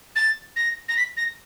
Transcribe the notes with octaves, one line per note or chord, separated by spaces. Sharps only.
A6
A#6
A#6
B6
A#6